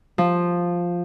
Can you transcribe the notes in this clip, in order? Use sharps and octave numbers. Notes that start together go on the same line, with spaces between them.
F3